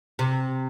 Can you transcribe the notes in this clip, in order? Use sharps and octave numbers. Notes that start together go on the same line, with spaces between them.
C3